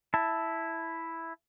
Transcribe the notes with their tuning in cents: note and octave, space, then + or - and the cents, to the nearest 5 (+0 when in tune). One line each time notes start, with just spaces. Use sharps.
E4 +0 A5 +0